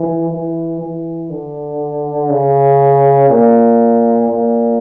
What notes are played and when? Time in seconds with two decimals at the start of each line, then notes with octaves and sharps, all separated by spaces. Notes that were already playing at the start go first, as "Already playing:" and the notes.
Already playing: E3
0.30 E3
0.80 E3
1.30 D3
2.30 C#3
3.30 A#2
4.29 A#2